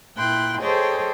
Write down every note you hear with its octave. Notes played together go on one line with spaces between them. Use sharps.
A#2 E4 G5 C6 F#6
G#4 A4 C5 C#5 D#5 G5